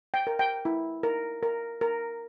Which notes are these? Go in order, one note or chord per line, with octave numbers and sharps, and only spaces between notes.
G5
A#4
G5
E4
A#4
A#4
A#4